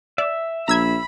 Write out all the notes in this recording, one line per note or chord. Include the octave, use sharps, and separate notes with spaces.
D5 E5
A#1 A#5 B5 E6 G#6